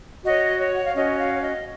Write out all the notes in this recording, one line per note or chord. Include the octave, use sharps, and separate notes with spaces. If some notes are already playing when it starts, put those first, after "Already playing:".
F#4 C#5 D#5
C#5
F#5
F5
C#4 F#4 C#5 D#5
F5
C#5
D#5